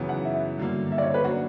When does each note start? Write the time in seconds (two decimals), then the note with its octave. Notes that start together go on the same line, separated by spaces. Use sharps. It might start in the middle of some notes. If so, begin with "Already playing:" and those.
Already playing: F#2 C#3 E3 B3
0.09 F#5
0.25 E5
0.58 G2 D3 F#3 A#3
0.92 E5
0.98 D5
1.02 C#5
1.14 B4
1.24 F#3 A#3 D4 F#4